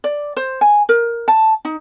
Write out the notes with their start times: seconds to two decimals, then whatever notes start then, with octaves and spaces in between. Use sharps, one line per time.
0.04 D5
0.37 C5
0.61 G#5
0.89 A#4
1.28 A5
1.65 D#4